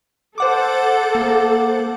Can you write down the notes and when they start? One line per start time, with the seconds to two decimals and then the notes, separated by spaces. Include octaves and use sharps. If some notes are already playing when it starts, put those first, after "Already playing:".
0.38 A4 C5 F#5 D6
1.15 A#3